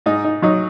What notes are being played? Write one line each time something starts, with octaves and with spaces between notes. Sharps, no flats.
G#2 D#4
D#4
F#3 D#4